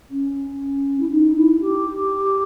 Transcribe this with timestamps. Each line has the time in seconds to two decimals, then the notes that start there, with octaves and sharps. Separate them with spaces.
0.10 C#4
1.00 E4
1.10 D#4
1.36 E4
1.60 G4